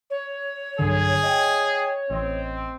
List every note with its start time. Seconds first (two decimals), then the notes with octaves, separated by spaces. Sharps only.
0.10 C#5
0.79 B1 G2 D3 G#4
1.23 C#5 D#5 G5
2.10 A1 C4 D#5